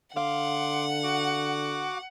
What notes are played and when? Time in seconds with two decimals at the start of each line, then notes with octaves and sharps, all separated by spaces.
0.16 D3 F5 F#5 C6 D6
1.04 F#4 D6